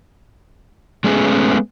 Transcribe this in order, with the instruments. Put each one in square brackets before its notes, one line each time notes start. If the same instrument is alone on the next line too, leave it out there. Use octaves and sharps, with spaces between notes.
[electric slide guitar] G#3 A3 B3 C#4 G#4